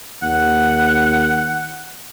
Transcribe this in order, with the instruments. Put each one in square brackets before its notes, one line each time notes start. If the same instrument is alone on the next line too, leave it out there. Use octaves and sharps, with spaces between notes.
[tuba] D#2 [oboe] F#5